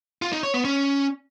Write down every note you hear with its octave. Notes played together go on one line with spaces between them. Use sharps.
F4
D#4
C#5
B3
C#4